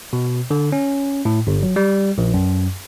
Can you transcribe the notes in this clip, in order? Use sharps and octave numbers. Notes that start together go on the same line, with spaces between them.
B2
D3
C#4
A2
G1
F#3
G3
A#1
F#2